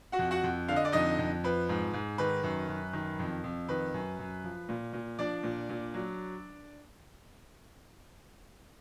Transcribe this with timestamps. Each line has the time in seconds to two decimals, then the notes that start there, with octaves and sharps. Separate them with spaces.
0.12 F#4 F#5
0.19 F2
0.31 F#4 F#5
0.44 F2
0.68 D3 F5
0.76 D#5
0.85 D5
0.92 F2 D#4 D#5
1.18 F2
1.44 F3 B4
1.69 G#2
1.93 G#2
2.18 D#3 B4
2.43 F#2
2.68 F#2
2.93 D#3
3.19 F2
3.44 F2
3.69 D#3 B4
3.94 F#2
4.19 F#2
4.43 F3
4.69 A#2
4.93 A#2
5.18 F3 D4 D5
5.43 A#2
5.69 A#2
5.94 F#3